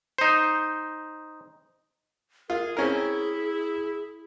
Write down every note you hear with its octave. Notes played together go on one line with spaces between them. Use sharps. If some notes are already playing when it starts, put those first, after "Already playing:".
D#4 C5
F4 G#4 A#4
C4 C#4 E4 G#4 A#4